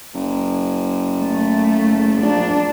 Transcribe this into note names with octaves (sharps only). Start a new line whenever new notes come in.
F#1
A3
A#1 D4